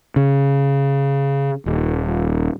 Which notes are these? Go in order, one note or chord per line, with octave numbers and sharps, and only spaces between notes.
C#3
D#1